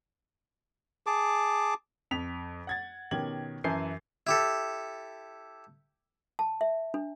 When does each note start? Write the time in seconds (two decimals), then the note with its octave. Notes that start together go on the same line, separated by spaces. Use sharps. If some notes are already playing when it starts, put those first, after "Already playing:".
1.07 G#4 A5 D6
2.11 F2 B6 F7
2.67 F#5 G#6 A6
3.11 B2 D#3 C#4 G4 G#6 F#7
3.64 F#2 E3 G#5 A5 G6 C7
4.27 E4 G4 A4
6.39 A5
6.61 E5
6.94 D4